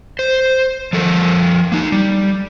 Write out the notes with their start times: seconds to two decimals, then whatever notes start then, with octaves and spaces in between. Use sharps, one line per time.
0.19 C5
0.93 F3 A4 A#4
1.72 A#3 D#4
1.92 G3